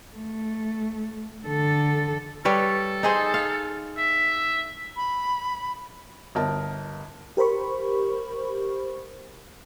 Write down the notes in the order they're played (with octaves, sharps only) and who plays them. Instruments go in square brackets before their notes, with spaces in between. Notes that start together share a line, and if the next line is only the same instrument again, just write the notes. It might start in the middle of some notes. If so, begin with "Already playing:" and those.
[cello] A3
D3 A4
[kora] G3 B4 C#5 [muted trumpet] A4
[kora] D#4 G#4 C5
F5
[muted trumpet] E5
[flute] B5
[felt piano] G1 A#4 D#5 A5
[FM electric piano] G4 A#4 C5 B5 C#6